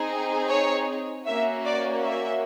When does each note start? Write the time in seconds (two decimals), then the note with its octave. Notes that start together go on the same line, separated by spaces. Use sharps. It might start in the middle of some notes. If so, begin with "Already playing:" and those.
Already playing: C4 D#4 G#4
0.48 C#5
1.26 A#3 C#4 F#4 E5
1.66 D5
2.05 E5